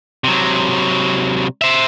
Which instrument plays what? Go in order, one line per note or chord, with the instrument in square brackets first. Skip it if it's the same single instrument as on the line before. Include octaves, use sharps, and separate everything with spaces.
[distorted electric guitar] C3 F#3
C5 E5